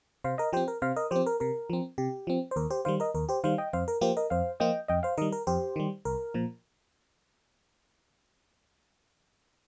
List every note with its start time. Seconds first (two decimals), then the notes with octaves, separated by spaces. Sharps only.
0.24 C3 C5 F5
0.38 A#4 D#5
0.53 F3 C4 G4 C5
0.68 A#4
0.82 C3 C5 F5
0.96 A#4 D#5
1.11 F3 C4 G4 C5
1.26 A#4
1.40 C3 A#4
1.70 F3 C4
1.98 C3 G4
2.27 F3 C4
2.51 C5
2.56 D#2 A#4
2.71 G4 C5
2.85 D#3 G3 C5 F5
3.00 A#4 D#5
3.15 D#2 A#4
3.29 G4 C5
3.44 D#3 G3 C5 F5
3.58 D#5 G5
3.73 F2 C5 F5
3.88 A#4
4.01 F3 A#3 F4 G4 C5
4.17 A#4 D#5
4.30 F2 C5 F5
4.60 F3 A#3 F4 D#5 G5
4.88 F2 D#5 G5
5.03 C5 F5
5.17 D#3 G3 A#4 D#5
5.32 A#4
5.47 F2 G4 C5
5.76 D#3 G3
6.05 C2 A#4
6.34 A#2 F3